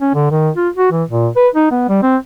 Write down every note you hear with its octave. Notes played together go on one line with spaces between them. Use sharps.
C#4
D3
D#3
F4
F#4
E3
A#2
B4
D#4
B3
G3
C4